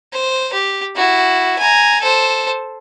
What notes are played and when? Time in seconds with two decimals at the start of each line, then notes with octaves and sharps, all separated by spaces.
0.13 C5
0.53 G4
0.96 E4 F#4
1.59 G#5 A#5
2.01 A4 C5